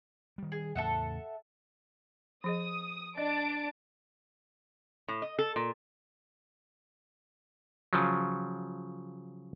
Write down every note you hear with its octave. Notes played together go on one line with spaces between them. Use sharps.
D#3 G3
G#4
E2 A2 C#3 A4 E5 F#5
F3 G#4 D#5 D#6
D4 D#5 A5 D7
A2
D#5
A4
A#2
C#3 F3 F#3